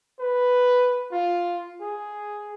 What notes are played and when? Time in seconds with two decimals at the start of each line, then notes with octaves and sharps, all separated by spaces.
0.19 B4
1.12 F4
1.81 G#4